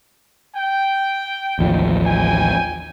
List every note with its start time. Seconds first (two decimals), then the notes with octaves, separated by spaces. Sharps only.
0.55 G5
1.59 A1 D#2 F3
2.05 G5 G#5